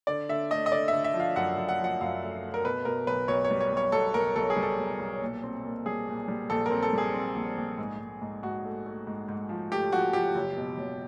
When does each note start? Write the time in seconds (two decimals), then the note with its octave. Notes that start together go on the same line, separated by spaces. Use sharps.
0.07 D3 D5
0.29 D3 E5
0.51 A3 D#5
0.66 D#5
0.72 D3 D5
0.88 D3 E5
1.04 E5
1.14 F3
1.20 F5
1.36 F#2 F#5
1.57 F#2
1.69 F#5
1.79 F3
1.84 F#5
2.01 F#2 F5
2.22 A3
2.43 A3
2.54 A#4
2.64 B2 B4
2.85 B2 A#4
3.07 B1 B4
3.28 B1 C#5
3.44 C#5
3.51 G3
3.60 C#5
3.72 B1 C#5
3.92 B1 A4
4.14 B1 A#4
4.36 B1 A4
4.50 G#4
4.57 G3
4.62 A4
4.79 B1
4.99 B1
5.22 A#2
5.43 C4
5.64 A#2
5.86 G3 G#4
6.08 A#2
6.28 G3
6.50 A#1 A4
6.66 C4 A#4
6.83 A4
6.93 G3 G#4
7.14 C4
7.36 A#1
7.57 A#1
7.78 G#2
7.99 G#2
8.22 G#2
8.43 G#2 F#4
8.65 A3
8.86 A3
9.07 G#2
9.28 G#2
9.49 F3
9.72 A3 G4
9.92 F3 F#4
10.13 F3 G4
10.35 F#1
10.57 B2
10.78 F#1